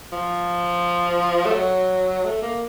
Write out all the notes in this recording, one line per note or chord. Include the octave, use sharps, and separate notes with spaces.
F3
A3
F#3
A3
A#3